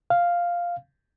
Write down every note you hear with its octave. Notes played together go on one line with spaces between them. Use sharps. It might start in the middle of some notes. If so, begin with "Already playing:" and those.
F5